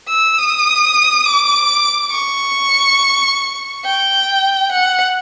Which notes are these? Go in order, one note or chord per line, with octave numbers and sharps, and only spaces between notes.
E6
D#6
D6
C#6
G5
F#5